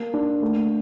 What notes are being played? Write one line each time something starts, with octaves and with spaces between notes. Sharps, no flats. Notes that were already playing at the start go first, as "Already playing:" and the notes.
Already playing: A#3
D4
A3